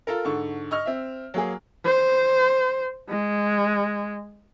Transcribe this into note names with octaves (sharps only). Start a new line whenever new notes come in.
F4 A4 A#4
G#2 D3 A4 C#6
D#5 C#6 F6
C4 E5
F#3 A#3 G#4
C5
G#3